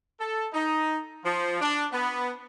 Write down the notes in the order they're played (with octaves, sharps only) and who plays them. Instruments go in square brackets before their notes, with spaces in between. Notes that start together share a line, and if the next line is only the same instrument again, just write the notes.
[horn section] A4
D#4
F3
D4
B3